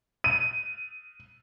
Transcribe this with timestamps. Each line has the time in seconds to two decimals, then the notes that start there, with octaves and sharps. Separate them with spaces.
0.24 D#7